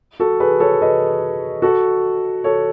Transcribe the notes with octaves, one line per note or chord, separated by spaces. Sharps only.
F#4 A4
G#4 B4
A4 C#5
B4 D#5
F#4 A4
A4 C#5